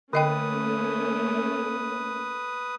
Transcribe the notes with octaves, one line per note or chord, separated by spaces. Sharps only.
D3 A3 A#3 C#4 B4 D#5 G5 D#6